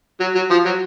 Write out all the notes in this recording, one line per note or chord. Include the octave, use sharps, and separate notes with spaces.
F#3
F#3
F3
F#3